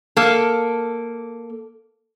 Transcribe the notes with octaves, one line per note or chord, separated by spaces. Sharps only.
A#3 A4